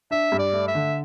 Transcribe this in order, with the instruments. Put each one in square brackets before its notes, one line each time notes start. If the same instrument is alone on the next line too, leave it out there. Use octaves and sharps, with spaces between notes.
[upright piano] D4 [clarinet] E5
[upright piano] G2
[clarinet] D5
[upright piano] A3
[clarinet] E5
[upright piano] D3